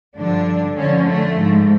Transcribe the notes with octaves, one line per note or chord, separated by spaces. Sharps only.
G2 D3 F3 D4
F2 D3 F3 C#4
A3
G#2 F3